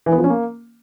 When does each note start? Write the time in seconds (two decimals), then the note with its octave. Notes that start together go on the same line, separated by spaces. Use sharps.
0.06 E3
0.12 B3
0.18 F3
0.24 C#4
0.30 A#3